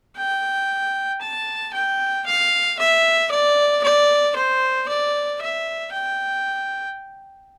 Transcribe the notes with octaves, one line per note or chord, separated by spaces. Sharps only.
G5
A5
G5
F5
E5
D5
D5
C5
D5
E5
G5